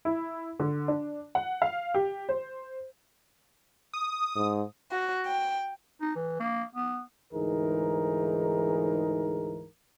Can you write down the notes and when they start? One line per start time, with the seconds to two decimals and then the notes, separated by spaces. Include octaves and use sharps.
0.05 E4
0.60 D3
0.88 D4
1.35 F#5
1.62 F5
1.95 G4
2.29 C5
3.93 D#6
4.35 G#2
4.92 F#4
5.27 G5
6.01 D#4
6.15 E3
6.40 A#3
6.75 B3
7.32 D2 G#2 E3 D#4 G#4 A#4